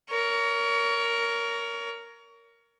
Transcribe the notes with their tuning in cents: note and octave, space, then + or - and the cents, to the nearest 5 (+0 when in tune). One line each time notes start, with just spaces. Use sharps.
A#4 +0 C#5 +30